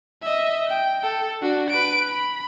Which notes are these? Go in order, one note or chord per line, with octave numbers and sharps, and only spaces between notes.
D#5 E5
G5
A4
D4 F#4
B4 D7
B5